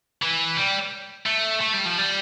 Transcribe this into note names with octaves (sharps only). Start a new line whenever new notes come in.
E3
G3
A3
A3
G3
F3
G3